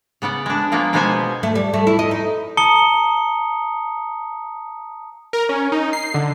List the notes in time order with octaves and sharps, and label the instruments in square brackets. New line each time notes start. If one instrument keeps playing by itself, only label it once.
[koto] C#3 B3 D5 F#5
G#3 D4
F3 G#3 A#3 B3
B2 G#3 A#3 B3 C5 G#5
[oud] A3
G3
A3
E4
D#5
D#4
[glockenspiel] A5 A#5 D#6 C#7 G7
[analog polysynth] A#4
C#4
D#4
C7
D3